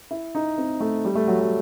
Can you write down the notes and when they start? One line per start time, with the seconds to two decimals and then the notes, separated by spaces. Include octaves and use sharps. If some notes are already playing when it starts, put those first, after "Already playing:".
0.11 E4
0.35 D#4
0.58 C4
0.80 A3
1.05 G3
1.15 A3
1.28 F#3
1.39 F#3